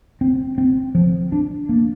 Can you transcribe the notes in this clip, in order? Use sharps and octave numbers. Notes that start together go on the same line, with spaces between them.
C4
C4
F3
D4
A#3